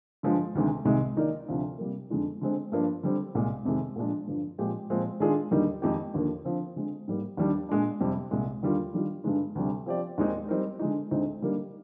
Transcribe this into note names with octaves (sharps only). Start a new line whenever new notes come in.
G2 D3 F3 G#3
D2 C3 D#3 G#3
C2 C3 D#3 G#3 D#4
D#3 A#3 D#4 A#4 D5
D2 C3 F3
C3 G3 A#3
F2 D3 G#3 D#4
D3 G#3 C4
G2 F3 A#3 D4
D3 G3 C4
C2 A#2 G#3
F2 C3 D#3 G#3
A#2 F3 G#3 D4
G2 D3 F3
A#2 F3 G#3 C4 G4
A#2 F3 G#3 C4
D#3 G#3 D4 F4 G#4
D#2 D3 G3 A#3 D#4
F2 D#3 G#3 D#4 G4
D#2 D3 F3 A#3
D3 F3 C4
D3 G#3 C4
G#2 G3 A#3
D#2 D#3 G3 D4
A#2 G#3 D4
F2 C3 G3 C4
C2 A#2 G#3
D#2 D3 G3 A#3 F4
D#3 G3 D4 F4
G2 D3 G#3 D#4
D2 C3 G3
F3 C4 G4 D5
D#2 D#3 G#3 C4 D#4
G3 C4 D#4 A#4
D3 G#3 D#4
D2 D3 G#3 C4 D#4
D3 G3 A#3 D#4